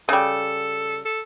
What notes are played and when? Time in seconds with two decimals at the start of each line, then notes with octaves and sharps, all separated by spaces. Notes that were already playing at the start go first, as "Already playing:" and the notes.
0.09 C#3 G3 A4
1.05 A4